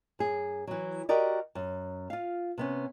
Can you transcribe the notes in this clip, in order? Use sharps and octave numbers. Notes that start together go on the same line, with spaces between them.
F#2 G#4
E3 F#3
F#4 G4 A#4 D5 D#5
F#2
F4 F5
C3 B3 C#4